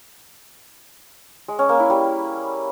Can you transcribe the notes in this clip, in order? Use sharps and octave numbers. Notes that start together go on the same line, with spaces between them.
G#3
C#4
A#3
E4
G3